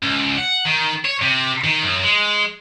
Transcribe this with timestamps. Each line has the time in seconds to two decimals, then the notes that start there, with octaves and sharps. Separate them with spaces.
0.02 C#2
0.37 F#5
0.65 D#3
1.05 C#5
1.22 C3
1.64 D#3
1.83 F#2
2.03 G#3